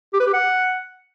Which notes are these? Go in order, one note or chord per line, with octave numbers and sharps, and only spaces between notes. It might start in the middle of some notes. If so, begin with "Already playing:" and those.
G4
B4
G4
F#5